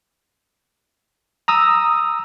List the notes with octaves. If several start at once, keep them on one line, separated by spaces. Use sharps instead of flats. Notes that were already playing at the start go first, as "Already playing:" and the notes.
A#5 D#6 E6